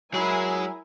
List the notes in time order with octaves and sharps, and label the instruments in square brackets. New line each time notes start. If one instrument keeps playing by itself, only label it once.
[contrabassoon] F#3 [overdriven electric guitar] G#3 G#4 [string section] E4 A#4 G#5